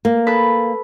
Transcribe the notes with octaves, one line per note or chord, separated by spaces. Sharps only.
A#3
A4 B4